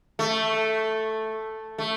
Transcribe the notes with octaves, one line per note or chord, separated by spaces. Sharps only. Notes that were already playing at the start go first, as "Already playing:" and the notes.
A3
A3